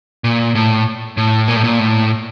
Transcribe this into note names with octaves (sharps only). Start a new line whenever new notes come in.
A#2
A2
A2
A#2
A2
A#2
A2